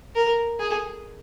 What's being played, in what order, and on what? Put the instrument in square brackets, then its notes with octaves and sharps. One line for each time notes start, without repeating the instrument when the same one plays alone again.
[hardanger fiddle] A#4
G#4